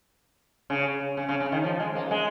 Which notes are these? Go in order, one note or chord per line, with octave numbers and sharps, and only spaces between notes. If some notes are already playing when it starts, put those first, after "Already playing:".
C#3
C#3
C#3
C#3
D#3
F3
G#3
A#3
G#3